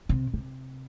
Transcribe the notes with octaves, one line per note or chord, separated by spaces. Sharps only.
C3
C3